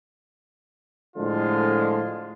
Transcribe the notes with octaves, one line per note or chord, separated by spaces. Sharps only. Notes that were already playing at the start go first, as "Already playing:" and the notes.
A2 D3 F3 G#3 F4